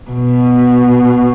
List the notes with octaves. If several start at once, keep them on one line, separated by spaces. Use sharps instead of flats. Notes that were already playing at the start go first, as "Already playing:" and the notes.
B2